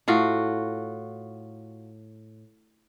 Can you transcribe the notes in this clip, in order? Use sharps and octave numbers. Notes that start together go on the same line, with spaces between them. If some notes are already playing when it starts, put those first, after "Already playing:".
A2 F4 F#4